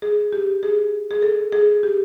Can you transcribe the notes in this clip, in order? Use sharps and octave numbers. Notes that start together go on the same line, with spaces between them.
G#4
G4
G#4
G#4
A4
G#4
G4